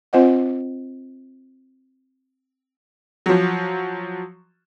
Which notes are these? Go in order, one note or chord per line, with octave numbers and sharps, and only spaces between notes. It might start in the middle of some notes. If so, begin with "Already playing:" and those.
C4 F4 C5 D#5 F#5
F3 F#3